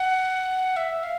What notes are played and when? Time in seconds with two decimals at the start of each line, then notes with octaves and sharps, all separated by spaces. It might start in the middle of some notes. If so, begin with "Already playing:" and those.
Already playing: F#5
0.76 E5
1.03 F5